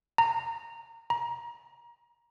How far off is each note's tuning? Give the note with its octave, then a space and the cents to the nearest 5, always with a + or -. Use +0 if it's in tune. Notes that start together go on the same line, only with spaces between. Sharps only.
A#5 -25
A#5 +25